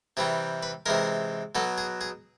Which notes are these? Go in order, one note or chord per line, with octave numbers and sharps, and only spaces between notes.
C3 E3 G3 G#4
B4
C3 E3 G#3 A#4
B2 F#3 A4
G#4
G#4